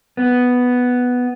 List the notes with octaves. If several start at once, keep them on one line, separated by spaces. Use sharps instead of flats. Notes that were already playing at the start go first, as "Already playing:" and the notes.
B3